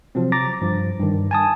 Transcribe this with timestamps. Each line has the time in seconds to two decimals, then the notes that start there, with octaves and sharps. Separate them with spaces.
0.15 C3 F3 F#3 C4
0.32 A#5 D6 A6 A#6
0.62 G2 F3
1.00 G2 D#3
1.31 G#5 A5 D#6